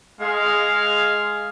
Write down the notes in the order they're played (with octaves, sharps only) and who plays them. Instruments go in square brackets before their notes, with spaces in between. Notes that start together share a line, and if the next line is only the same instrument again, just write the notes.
[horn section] G#3 F5